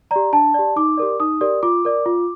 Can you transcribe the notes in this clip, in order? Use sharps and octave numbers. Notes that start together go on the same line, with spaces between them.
G4 D5 A#5
D4 A5
G4 D5
D#4 D6
G4 A#4 D5
D#4 D#6
G4 A#4 D5
F4 D6
A#4 D5
F4